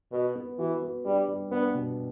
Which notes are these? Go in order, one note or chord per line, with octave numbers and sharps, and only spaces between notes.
B2 B4
B3
E3 F#4
B3
G3 D4
G3
B3 D4
B2